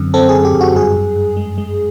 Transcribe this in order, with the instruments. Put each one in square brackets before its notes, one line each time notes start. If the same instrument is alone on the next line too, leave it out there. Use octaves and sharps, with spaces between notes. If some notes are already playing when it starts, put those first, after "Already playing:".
Already playing: [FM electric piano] F#2 D3 C4
C4 A4
G#4
F#2
G4
F#2
F#4
G2 G#4
G2
G2
G#3
G#3